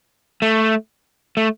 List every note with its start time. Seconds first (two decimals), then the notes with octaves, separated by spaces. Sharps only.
0.42 A3
1.37 A3